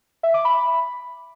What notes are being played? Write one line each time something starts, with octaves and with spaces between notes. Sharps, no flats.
E5
D6
B5